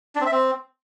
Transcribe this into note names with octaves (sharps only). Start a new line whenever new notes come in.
D4
C4
E5
C4